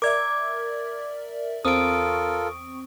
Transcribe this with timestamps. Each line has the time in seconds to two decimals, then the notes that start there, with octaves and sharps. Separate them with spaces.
0.02 A#4 D5 E5 D6 G#6
1.65 E2 C4 F4 A4 A#4 C#6 D#6 D7